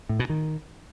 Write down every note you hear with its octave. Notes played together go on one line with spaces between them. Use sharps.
A2
B2
D#3